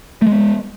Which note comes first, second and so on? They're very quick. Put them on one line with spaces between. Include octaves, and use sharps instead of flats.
A3 G#3 B3